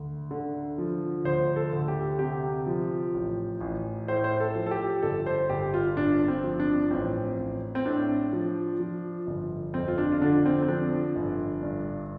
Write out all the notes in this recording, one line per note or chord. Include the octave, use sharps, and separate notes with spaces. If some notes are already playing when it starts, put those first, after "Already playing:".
Already playing: D2
D3
F3
D2 C5
A4
D2
G4
C3 G4
F3
A1
A1
A2 C5
C5
A4
F3
A4
G4
G1 A4
C5
G1 G4
F4
G2 D4
C4
F3
D4
A1 C4
A1
C4
A2 D4
F3
F3
G1
F2 C4
F4
D4
F4
D3 D4
C4
C4
F3 D4
G1
G2